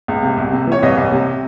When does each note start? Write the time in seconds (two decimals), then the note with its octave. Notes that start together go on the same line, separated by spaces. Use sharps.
0.08 C#2
0.23 C3
0.37 C2
0.53 C3
0.67 E3 C#5
0.83 C2 D#5
0.97 C2
1.12 C3